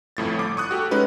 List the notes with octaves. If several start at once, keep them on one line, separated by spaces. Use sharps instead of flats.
G1 F2 A2 A6
D6
C#6 D#6 F#6
F#4 G4 A4
G#3 C#4 D#4 B4